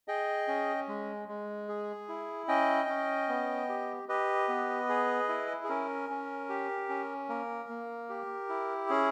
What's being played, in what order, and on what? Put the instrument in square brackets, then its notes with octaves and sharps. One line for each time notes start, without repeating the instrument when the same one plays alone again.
[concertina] G#4 D#5 G5
C#4
G#3
G#3
G#4
E4
C#4 D#5 G5
C#4
B3
G4
G4 B4 D#5
B3
G#4
E4
G#4
C#4 A#4
C#4
G4
C#4
A#3 A#4
A#3
G4
E4
C#4 G#4